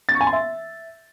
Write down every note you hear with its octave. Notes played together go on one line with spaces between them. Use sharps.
A6
C#6
G#5
C6
E5